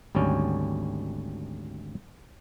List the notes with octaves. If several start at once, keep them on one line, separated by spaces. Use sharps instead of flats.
G#1 D2 G3 C#4